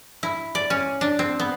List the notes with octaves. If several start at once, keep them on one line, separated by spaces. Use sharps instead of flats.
E4
D5
C#4
D4
C4
B3